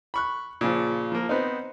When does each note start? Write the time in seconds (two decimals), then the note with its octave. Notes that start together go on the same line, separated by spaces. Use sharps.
0.14 B5 C#6 F#6
0.61 A#2 C#3 F3
1.12 F3 A#3
1.29 B3 C4 D#4